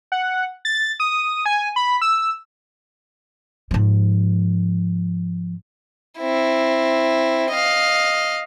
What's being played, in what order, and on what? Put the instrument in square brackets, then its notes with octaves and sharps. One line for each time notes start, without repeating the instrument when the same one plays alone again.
[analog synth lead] F#5
A6
D#6
G#5
B5
E6
[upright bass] G#2 F3
[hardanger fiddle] C4 E4
D#5 F5